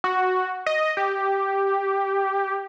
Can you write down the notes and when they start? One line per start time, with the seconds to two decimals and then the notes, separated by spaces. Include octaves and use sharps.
0.04 F#4
0.66 D#5
0.97 G4